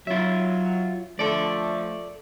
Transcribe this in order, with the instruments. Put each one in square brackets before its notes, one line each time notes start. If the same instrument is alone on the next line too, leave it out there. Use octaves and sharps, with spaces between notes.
[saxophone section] F#3 [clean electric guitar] F4 E5
[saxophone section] F3 A3 [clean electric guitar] A4 D5